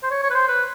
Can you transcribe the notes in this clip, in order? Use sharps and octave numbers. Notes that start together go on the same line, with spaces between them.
C5
C#5
C#5
B4
C5
B4